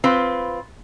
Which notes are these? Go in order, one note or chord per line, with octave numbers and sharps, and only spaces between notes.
C4 F4 B4